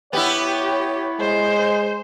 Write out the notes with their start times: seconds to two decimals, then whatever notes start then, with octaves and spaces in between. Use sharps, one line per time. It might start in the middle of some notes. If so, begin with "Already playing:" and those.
0.13 B3 E4 G4 C#5
1.20 G#3 C5